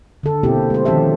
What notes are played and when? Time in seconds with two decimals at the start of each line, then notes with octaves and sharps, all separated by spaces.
0.23 D3 A4
0.43 B2 A#3 C4 E4 G4
0.70 G#3 C5
0.85 D#3 F3 C#4 G4 A4 E5